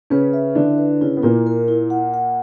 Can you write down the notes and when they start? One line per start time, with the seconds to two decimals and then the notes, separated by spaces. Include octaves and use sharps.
0.10 C#3 C#4 B4
0.33 E5
0.55 D3 D4 E4
0.78 B4
1.01 C#3 C#4 E4
1.17 B3
1.23 A#2 A#3 E4
1.46 A#4
1.68 E4
1.90 F#5
2.14 F#5